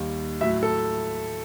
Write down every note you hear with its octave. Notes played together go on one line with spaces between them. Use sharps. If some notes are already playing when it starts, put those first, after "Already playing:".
Already playing: D#2 D#3 G3
A2 F#3 E5
A4